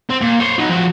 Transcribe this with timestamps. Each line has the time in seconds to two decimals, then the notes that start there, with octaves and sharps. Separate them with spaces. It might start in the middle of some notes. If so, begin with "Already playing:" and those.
0.09 C4
0.21 A#2
0.40 C5 C#5
0.58 F#3 D#4
0.69 F3 F#4